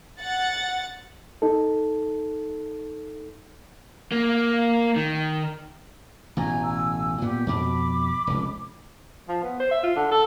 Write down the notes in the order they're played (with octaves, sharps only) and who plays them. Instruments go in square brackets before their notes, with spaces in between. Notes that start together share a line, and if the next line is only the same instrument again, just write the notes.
[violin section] F#5 A6
[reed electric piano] D#4 A4
[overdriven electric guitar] A#3
D#3
[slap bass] A1 B2 [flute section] G#5 A#5
[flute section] G#5 E6
[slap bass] A#2 B3 [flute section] G4
[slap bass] F2 B2 [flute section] B5 D6
[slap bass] F1 C#2
[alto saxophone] F3
B3
C5
E5
F4
D3
A4